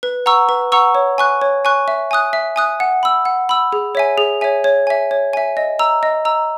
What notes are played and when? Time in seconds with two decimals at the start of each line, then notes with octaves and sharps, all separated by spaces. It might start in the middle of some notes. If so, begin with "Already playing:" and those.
0.03 B4
0.26 F#5 A#5 C#6 E6
0.49 B4
0.72 F#5 A#5 C#6 E6
0.95 C#5
1.18 G#5 C#6 F#6
1.41 C#5
1.65 G#5 C#6 F#6
1.88 E5
2.11 G#5 D#6 F#6
2.33 E5
2.56 G#5 D#6 F#6
2.80 F#5
3.03 B5 E6
3.25 F#5
3.49 B5 E6
3.72 G#4
3.95 C#5 E5 G#5
4.18 G#4
4.41 C#5 E5 G#5
4.64 C#5
4.87 E5 G#5
5.11 C#5
5.33 E5 G#5
5.57 D#5
5.79 A#5 E6
6.03 D#5
6.25 A#5 E6